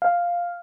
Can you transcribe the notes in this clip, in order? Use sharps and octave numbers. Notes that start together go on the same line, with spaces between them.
F5